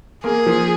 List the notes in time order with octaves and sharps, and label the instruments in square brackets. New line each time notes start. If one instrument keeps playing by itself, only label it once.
[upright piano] A#3 [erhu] G#4
[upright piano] F3